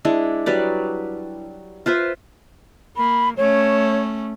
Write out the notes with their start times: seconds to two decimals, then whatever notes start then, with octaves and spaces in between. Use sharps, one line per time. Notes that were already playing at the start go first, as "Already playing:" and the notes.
0.05 G#3 D4 E4
0.46 F#3 G3 B4 D5
1.86 F4 B4 C5 E5
2.97 A#3 B5
3.37 A3 C#4 C#5